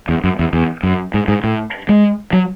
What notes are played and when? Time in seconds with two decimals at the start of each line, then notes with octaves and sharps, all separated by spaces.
0.09 E2
0.24 F#2
0.39 E2
0.53 E2
0.83 F#2
1.14 G#2
1.28 G#2
1.44 A2
1.89 G#3
2.33 F#3